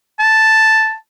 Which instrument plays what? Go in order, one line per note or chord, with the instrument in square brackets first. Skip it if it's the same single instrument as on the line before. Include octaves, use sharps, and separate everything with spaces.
[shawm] A5